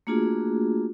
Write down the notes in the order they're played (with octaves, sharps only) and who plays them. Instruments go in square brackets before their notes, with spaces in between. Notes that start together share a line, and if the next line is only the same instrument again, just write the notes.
[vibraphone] A3 A#3 D4 F4 F#4 G#4